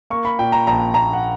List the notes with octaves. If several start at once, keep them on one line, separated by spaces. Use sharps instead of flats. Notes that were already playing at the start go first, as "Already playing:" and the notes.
A#3 C#6
B5
A#2 G5
A#5
A#1 A#5
A#1 A#5
F#5